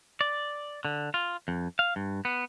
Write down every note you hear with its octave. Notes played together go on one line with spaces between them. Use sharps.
D5
D3
F4
F2
F5
G2
B3